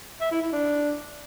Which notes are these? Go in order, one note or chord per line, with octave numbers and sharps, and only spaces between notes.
E5
E4
E4
D4